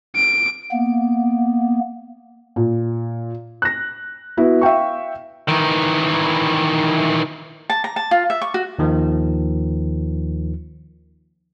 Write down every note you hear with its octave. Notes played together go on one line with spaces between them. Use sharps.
D7
A#3 B3
A#2
F#6 A#6
B3 E4 F#4
E5 F5 G5 C#6
D#3 E3
A5
A#5
A5
F4
E5
C#6
F#4
D#2 D#3 F3